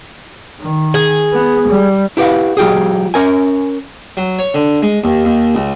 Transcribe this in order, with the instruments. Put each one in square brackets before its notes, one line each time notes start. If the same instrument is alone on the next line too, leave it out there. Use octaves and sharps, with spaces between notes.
[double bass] D#3
[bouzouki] G#4
[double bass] B3
G3
[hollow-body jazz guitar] E4 G4 B4 F5 F#5
F#3 F4 G4 G#4
C#4 A#4 G#5
[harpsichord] F#3
C#5
D3
G#3
D#2
D#2
C#2